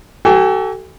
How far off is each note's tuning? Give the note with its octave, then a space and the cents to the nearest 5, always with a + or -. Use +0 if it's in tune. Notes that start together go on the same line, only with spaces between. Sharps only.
F#4 +45 A4 +0 G#5 -35